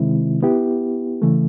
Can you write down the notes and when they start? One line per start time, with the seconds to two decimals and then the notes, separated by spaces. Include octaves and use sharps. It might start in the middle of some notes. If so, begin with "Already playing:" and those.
Already playing: C3 D#3 G#3 C4 E4
0.43 B3 E4 G4
1.22 C#3 E3 A3